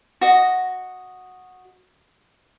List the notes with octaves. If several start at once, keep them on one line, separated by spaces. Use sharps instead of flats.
F#4 D#5